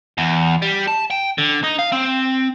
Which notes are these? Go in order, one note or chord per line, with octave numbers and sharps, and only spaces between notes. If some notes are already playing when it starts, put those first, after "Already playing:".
E2
G3
A5
G5
D3
D#4
F5
C4